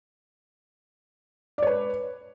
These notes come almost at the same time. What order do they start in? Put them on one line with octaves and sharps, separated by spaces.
D5 C#5 B4